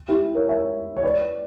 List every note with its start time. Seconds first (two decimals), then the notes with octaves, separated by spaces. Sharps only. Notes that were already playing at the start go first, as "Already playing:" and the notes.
0.08 E4 G4
0.35 A#4 C#5
0.49 C#5 E5
0.97 C#5
1.03 B4 D5